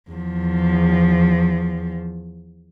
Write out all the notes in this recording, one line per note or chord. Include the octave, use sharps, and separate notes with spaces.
E2 F3